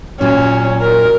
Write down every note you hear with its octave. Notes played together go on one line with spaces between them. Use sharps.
A#2 F#3 C#4
A#4